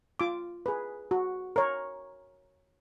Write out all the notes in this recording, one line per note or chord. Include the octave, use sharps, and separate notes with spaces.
F4 D6
G#4 B4
F#4
A#4 C#5